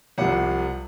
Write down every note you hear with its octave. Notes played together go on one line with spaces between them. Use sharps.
C2 C3 F3 F#5